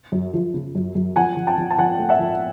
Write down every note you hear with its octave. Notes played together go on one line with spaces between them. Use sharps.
F#2
F3
C#3
F#2
F#2
F3 F#5 G#5
F3
G5 A5
F3
A5
F3 F#5 G#5
A3
E5 F#5
F3